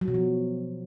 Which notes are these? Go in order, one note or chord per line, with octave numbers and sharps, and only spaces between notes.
F#3
B2
F3